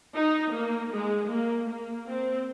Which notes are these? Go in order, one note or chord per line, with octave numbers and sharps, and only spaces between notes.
D#4
A#3
G#3
A#3
A#3
C4